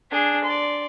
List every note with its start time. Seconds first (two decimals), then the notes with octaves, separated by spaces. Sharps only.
0.11 D4 G#4
0.45 D5 C6